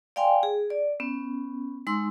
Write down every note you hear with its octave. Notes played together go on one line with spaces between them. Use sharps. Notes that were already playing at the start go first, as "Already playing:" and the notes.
D5 F5 G5 G#5 C6
G#4
D5
B3 C#4
G#3 D#4 C6 E6